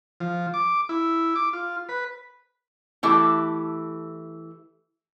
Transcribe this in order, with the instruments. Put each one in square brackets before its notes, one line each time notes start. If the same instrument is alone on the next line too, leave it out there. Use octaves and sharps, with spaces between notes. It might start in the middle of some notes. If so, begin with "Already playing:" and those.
[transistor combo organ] F3
D6
E4
D6
F4
B4
[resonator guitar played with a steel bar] E3 A3 E4 G4 A4 E5